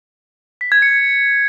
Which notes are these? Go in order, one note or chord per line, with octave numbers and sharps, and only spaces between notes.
B6
G#6
C#7